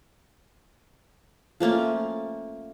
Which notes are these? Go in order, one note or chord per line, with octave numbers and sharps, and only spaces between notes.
F3 A3 A#3 C#4